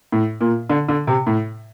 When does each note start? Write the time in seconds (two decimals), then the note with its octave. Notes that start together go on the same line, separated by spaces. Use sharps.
0.12 A2
0.41 A#2
0.70 D3
0.89 D3
1.07 C3
1.27 A2